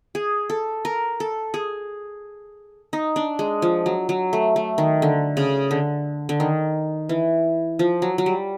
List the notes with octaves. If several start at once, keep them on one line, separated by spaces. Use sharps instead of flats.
G#4
A4
A#4
A4
G#4
D#4
D4
G#3
F3
F#3
F#3
A3
A3
D#3
D3
C#3
D3
D3
D#3
E3
F3
F#3
F#3
G3